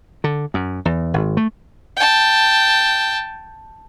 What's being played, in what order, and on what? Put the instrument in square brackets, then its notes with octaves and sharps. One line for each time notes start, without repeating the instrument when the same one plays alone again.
[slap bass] D3
F#2
E2
G#1
A3
[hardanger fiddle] G5 A5